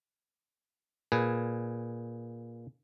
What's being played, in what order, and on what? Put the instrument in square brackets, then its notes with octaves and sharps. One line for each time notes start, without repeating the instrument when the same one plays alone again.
[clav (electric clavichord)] A#2 G#4 B4